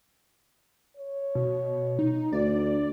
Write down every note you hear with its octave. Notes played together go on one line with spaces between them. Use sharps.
C#5
B2
D#4
D2 D5